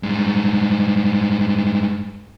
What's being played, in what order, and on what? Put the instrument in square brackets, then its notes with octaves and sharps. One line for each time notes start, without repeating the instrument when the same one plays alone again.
[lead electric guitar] G2 G#3